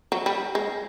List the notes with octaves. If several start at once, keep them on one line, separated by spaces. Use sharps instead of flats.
F#3
G3
G#3